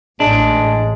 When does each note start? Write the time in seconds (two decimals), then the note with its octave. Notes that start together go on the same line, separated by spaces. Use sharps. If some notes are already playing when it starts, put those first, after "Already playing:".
0.20 A1 A2 G#3 D4